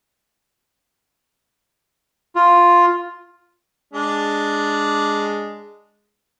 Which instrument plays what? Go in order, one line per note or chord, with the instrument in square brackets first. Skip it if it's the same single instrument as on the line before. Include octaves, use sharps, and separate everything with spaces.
[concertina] F4
[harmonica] G#3 D4